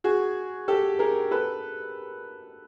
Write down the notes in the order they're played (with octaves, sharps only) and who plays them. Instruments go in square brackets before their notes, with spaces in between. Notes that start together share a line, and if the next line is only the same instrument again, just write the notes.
[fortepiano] F#4 G#4
G4 A4
G#4 A#4
A4 B4